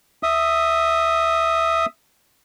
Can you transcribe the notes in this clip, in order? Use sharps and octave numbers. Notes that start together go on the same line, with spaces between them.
E5 D#6